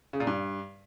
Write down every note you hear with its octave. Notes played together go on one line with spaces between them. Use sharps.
C#3
A#2
G2